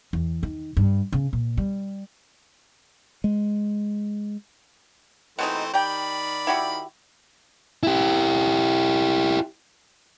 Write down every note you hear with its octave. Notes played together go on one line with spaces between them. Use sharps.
E2
D#3
G2
C#3
A#2
G3
G#3
B2 E3 G#3 A3 C4 D#4
D#3 G4 D5 G5 B5
E4 F#4 G4
E4 G4